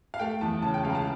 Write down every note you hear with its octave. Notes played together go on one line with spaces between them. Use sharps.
F5
A3 G5
E2 A5
C#3 A5
G5
C#2 F5
A#5
A5